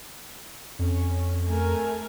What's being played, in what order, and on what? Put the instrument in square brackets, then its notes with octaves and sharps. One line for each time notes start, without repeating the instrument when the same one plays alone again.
[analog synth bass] F2 [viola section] C#4
[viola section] A3 A#4 G#5